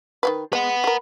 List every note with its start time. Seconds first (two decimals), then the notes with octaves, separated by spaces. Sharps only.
0.23 D#3 G#3 B4
0.53 G#3 B4 F#5
0.84 G#4 A#4